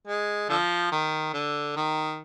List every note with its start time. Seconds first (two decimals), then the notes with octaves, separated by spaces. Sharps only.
0.07 G#3
0.49 D3 F3
0.92 D#3
1.34 D3
1.76 D#3